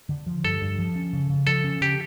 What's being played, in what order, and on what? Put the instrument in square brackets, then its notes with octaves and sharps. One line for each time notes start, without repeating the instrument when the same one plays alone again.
[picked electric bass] D3
F3
[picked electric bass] G2 [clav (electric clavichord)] A4
[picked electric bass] G2
F3
C#4
C#3
C#3
[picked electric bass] F3 [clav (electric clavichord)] A4
[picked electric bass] C#4
[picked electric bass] C#3 [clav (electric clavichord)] G4